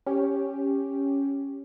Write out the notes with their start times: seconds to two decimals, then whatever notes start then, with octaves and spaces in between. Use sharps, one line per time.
0.06 C#4 G4